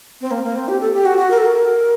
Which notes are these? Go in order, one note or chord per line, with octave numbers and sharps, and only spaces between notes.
C4
A#3
A#3
C4
G4
A4
G4
F#4
F#4
A#4
A4
A#4